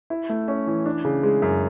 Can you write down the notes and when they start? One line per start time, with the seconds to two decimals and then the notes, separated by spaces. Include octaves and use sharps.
0.10 E4
0.30 A3
0.48 C#4
0.67 E3
0.86 D4
1.05 C#3
1.23 G#3
1.42 F#2